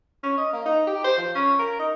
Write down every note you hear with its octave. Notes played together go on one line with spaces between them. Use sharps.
C#4
D#5
A#3
D#4
G4
C5
F3
C#4
A#4
D#4